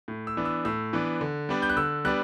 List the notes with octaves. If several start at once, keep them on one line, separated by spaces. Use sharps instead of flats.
A2
E6
E3 B3 D4
E6
A2 E6
E3 B3 D4
D3
G3 B3 D4
G6
F#6
D3 E6
G3 B3 D4 F#6